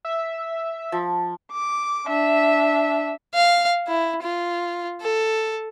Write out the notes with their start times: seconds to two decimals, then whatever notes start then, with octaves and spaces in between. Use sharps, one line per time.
0.05 E5
0.92 F3
1.52 D6
2.08 D4 E5
3.34 F5
3.88 E4
4.22 F4
5.01 A4